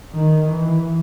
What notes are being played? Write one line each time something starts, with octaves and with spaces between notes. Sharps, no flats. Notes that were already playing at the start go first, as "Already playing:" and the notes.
D#3
E3